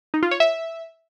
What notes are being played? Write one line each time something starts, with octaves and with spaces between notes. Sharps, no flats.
D#4
F4
C#5
E5